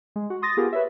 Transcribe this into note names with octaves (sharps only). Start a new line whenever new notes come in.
G#3
F#4
C6 D#6 A6 A#6
B3 F4 G4 G#4 A#4
B4 C#5 E5